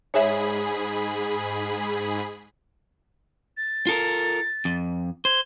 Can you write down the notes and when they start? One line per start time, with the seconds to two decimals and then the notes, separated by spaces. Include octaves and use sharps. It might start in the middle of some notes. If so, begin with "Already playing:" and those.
0.14 G#2 G#4 C#5 E5 B5
3.57 A6
3.87 F4 A4 A#4
4.65 F2
5.25 C5 G#6